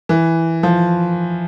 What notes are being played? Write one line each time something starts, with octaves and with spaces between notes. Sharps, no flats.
E3
F3